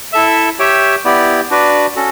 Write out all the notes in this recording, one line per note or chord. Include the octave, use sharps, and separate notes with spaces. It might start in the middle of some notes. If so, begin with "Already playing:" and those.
E4 A4 E5
G4 C#5 E5 G5
B3 E4 G4 D5
D4 F#4 B4 D5
C#4 F#4 A4